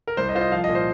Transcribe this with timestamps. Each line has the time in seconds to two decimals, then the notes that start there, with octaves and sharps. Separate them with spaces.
0.07 A#4
0.17 C2 C5
0.29 D#5
0.35 F4 C5
0.41 D#5
0.52 F3 F5
0.64 D#5
0.69 A#2
0.75 C5